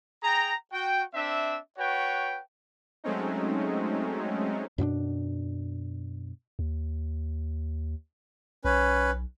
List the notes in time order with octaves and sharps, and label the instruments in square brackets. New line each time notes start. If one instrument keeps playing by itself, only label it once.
[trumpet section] G#4 G5 A#5
F#4 G5
C4 D4 E5
F#4 B4 C#5 F#5 G5
[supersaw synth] F#3 G#3 A3 C4 C#4 D#4
[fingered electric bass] F#2 B2 B3 D4
[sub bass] D#2
[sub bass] B1 [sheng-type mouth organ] C#4 B4